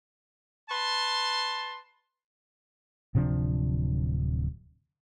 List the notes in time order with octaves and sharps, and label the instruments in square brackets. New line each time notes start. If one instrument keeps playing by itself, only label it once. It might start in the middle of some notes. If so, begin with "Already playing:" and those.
[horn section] B4 A5 C6
[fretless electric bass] D1 C3 F3 D4